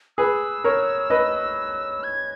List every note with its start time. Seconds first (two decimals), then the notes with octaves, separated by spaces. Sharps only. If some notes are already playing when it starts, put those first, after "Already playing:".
0.18 G#4 B4 E6
0.64 A#4 C#5
1.10 B4 D#5
2.04 G#6